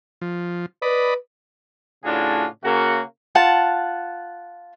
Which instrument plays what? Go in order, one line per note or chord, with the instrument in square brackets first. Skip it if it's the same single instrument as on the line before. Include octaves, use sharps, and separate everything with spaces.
[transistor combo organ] F3
[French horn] B4 [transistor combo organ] D5 D#5 B5
[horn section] A2 C#3 D4 F4 F#4 G#4
C#3 A#3 F#4
[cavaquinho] F4 F#5 A5